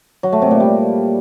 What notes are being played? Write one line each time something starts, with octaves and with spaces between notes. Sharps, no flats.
F#3
A3
C3
A#2
G3